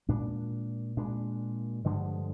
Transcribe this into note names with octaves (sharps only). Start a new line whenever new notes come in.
A#2 G#3 D4
A#2 G#3 D4
G2 D3 F3 G#3